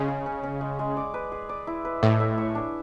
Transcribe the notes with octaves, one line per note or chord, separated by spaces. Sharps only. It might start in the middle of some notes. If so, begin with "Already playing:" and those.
Already playing: C#3 G#3
G#4
C#4
C#4
G#3
G#3
D5
B4
G#4
D5
E4
B4
A2 E5
E5
C#5
D4